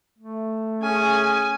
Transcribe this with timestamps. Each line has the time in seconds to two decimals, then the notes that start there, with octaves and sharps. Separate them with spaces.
0.19 A3
0.83 C#4 G#4 G#5